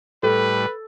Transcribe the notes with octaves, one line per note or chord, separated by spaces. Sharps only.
A2 G3 A4 B4